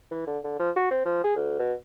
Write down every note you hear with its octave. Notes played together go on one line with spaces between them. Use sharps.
E3
D3
D3
F3
F#4
C4
F3
G#4
D2
B2